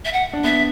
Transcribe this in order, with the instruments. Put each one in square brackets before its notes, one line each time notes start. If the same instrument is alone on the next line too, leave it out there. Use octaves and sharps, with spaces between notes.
[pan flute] E5
F#5
[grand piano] D4
[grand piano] B3 [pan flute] E5